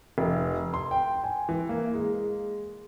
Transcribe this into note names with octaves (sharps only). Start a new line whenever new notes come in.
F1
C6
G5
G#5
E3
A#3
G#3